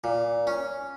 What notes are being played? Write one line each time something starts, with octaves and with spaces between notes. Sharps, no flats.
A#2
C#4